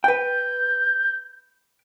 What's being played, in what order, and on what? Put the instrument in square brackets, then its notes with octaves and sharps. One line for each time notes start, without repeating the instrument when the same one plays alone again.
[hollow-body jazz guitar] B4 G5 [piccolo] G6